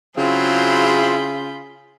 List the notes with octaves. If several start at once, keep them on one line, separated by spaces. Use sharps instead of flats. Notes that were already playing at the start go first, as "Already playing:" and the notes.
C#3 F#3 C4 E4 F4 G#4 B5 G6